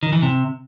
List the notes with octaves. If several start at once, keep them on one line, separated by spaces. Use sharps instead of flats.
D#3
E3
C3